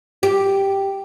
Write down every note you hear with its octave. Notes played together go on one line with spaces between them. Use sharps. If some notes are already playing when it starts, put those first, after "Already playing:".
G4